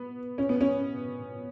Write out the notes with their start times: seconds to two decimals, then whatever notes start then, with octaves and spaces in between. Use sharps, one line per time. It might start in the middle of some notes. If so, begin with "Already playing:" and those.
Already playing: B3
0.38 C#4
0.49 B3
0.61 C#4